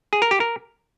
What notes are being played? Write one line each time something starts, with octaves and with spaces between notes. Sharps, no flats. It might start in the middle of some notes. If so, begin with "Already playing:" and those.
G#4
A#4
G4
A#4